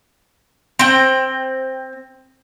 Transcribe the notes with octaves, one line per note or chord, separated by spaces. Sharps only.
C4 G5